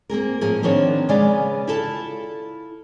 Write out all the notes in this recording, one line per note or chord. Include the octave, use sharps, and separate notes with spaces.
A#3 C4 G#4 A#4
A2 F3 A#3 G#4
D#3 F3 B3 C4 D4 C#5
C#3 G#3 B3 G#4 D5 F5
E4 F4 A4 A5